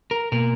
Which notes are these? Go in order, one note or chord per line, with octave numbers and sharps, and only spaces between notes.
A#4
B2 A#3 A#4